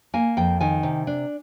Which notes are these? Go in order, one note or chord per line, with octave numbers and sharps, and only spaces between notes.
A#3 G#5
F2 G5
D#3 G#5
C3
D4